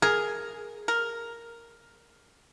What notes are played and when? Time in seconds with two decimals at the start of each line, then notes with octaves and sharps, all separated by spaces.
0.02 G#4 A#4
0.88 A#4